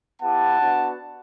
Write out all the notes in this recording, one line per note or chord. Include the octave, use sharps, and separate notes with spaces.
B3 E4 G4 F#5 A5
B3 D4 F#4